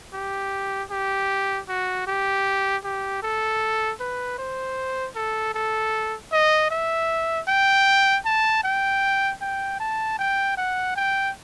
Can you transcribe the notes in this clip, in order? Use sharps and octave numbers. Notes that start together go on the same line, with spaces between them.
G4
G4
F#4
G4
G4
A4
B4
C5
A4
A4
D#5
E5
G5
A5
G5
G5
A5
G5
F#5
G5